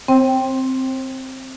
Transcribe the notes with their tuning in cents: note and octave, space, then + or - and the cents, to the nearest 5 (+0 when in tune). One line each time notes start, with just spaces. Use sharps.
C4 +0 C5 +35 G5 +0